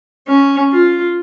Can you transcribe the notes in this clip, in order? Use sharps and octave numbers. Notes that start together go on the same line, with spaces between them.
C#4
F4